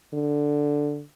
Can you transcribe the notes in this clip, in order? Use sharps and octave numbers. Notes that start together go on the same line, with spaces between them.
D3